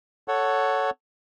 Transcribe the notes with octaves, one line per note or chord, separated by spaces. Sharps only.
A4 C#5 F#5